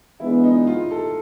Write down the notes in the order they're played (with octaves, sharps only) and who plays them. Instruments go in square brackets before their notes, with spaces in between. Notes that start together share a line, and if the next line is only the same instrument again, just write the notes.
[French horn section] E3 G#3 B3 D4 [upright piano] E4
[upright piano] D#4
F4
A4